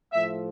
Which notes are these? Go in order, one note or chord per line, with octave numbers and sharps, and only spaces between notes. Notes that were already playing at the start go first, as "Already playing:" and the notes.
A2 F3 A3 E5